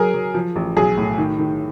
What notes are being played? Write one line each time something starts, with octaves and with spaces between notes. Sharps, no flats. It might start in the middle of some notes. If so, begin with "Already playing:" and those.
Already playing: F#3 G#4 A#4
F#3
F3
A1
B1 G#4
A2
D#3
D#3